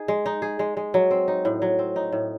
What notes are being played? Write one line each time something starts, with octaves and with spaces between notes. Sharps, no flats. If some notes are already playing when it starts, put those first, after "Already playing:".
Already playing: D#4 G#4
G#3
D#4
G#4
G#3
G#3
F#3
C4
D#4
A2
F#3
C4
D#4
A2